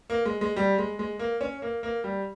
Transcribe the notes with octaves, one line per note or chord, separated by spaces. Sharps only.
A#3
G#3
G#3
G3
G#3
G#3
A#3
C#4
A#3
A#3
G3